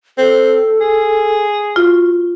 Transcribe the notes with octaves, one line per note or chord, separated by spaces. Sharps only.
C4 A4
G#4
F4 F#4